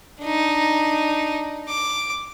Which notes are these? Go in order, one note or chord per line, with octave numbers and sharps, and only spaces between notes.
D4 D#4
D6